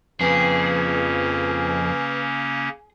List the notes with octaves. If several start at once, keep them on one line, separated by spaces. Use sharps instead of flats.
F2 C#3 A#3 C#4 G#4 B4